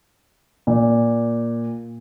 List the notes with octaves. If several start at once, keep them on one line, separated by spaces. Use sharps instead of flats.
A#2